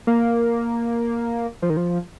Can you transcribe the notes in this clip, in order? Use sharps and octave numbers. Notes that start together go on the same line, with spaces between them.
A#3
F3
D#3
F3